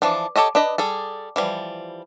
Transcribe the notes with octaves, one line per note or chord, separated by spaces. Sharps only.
E3 F3 D4
G4 A4 C#5 D#5
D4 B4 D#5
G3 G#4 A4
E3 F3 G3